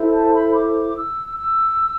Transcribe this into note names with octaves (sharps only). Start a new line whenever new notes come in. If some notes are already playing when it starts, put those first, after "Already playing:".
Already playing: E4 A4 C5
A5
B5
D6
E6
E6